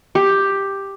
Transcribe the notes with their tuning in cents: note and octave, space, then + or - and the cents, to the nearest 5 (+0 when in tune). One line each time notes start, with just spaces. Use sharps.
G4 +5